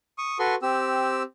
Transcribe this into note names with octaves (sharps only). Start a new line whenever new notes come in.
C#6 D#6
F#4 A4 B4 C6 C#6
C4 G4 E6